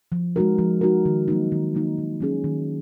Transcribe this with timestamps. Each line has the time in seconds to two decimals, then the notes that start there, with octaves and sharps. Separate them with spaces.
0.12 F3
0.36 G#3 D#4 F#4 A#4
0.58 F3
0.81 G#3 D#4 F#4 A#4
1.06 D#3
1.28 F#3 A#3 D#4
1.52 D#3
1.75 F#3 A#3 D#4
1.98 D#3
2.20 F#3 C#4 G#4
2.44 D#3